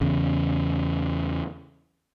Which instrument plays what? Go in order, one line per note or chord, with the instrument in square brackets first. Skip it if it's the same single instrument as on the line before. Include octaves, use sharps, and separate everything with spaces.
[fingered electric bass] E2 C#3